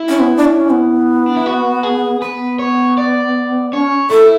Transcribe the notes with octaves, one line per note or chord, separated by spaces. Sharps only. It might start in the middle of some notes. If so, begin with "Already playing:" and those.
Already playing: E4
C#4
B3
D4
C#4
B3
D4
E4
F#4
G#4
B3 B4
C#5
D5
C#4 C#5
E4 A4